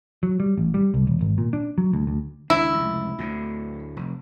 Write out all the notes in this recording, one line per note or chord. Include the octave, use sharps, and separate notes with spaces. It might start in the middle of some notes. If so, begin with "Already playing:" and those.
F#3
G3
A1
G3
C2
E1
G#1
A#2
D4
F#3
D2
D2
C#2 D#3 D4 E4
F1 C#2
D2 A2 D3
F1